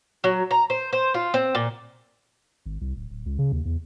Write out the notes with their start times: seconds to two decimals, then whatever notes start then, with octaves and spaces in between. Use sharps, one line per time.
0.24 F#3
0.51 A#5
0.70 C5
0.93 C5
1.14 F4
1.34 C4
1.55 A#2
2.66 G#1
2.81 C2
2.96 D1
3.10 D1
3.26 C#2
3.39 C#3
3.52 D#2
3.65 E2